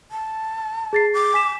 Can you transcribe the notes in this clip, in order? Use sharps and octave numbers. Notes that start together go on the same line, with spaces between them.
A5
G#4 A6 C7
D6
G#5 B6 E7